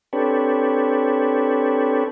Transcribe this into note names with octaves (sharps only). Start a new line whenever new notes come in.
C4 D4 G4 A4 B4 C#5